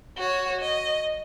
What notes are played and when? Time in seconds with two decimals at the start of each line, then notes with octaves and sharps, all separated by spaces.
0.17 F#4 C#5
0.61 D#5